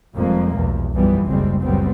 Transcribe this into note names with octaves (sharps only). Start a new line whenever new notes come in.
F1 F2 F3 G3 G#3 A#3
B1 E2
B1 F#2 E3 F3 G3 B3
F#1 C#2 G3 G#3 C4
F#1 C#2 A2 G3 B3 C4